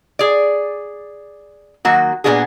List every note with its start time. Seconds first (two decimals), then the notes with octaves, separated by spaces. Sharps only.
0.19 G#4 D5
1.85 D#3 F#3 A#3 F#4
2.24 A#2 C#3 B3 D4 F#4 G#4